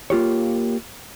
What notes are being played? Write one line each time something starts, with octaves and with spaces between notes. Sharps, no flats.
A#3 F4 G4 C#5